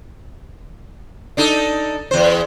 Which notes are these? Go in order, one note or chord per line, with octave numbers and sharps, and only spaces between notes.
D4 D#4 A4
E2 C5